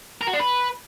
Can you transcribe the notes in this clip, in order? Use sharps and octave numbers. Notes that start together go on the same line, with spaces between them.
A#4
F#4
D4
B4